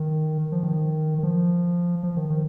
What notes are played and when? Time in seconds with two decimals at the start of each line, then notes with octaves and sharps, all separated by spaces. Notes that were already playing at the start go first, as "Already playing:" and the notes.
Already playing: D#3
0.52 F3
0.63 D#3
1.18 D#3
1.23 F3
2.03 F3
2.16 D#3
2.30 D#3